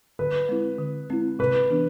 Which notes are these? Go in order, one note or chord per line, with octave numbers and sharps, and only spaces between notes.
D3 B4
G#3 C4 E4
D3
G#3 C4 E4
C3 B4
E3 B3 D4